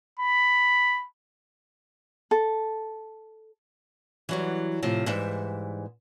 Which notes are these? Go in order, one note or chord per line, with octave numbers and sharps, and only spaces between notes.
B5
A4
E3 F#3 G3
A2 C3 F3
G#2 E3 G3 E5